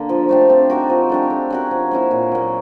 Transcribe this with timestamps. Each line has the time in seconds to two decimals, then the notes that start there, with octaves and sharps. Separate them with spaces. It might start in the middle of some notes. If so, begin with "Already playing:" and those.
Already playing: D3 A#3
0.09 F3
0.29 A3 D4 G4
0.50 C4
0.70 D#4 F#4 A#4
0.90 F3
1.10 A3 D4 G4
1.30 A3
1.50 C#4 F#4 A#4
1.71 F3
1.91 A#3 C#4 E4
2.11 A#2
2.32 F#3 A#3